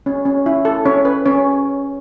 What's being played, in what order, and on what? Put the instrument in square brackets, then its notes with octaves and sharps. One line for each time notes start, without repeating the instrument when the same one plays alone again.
[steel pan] C#4
C#4
E4
A4
C#4 C#5
B4
C#4 C#5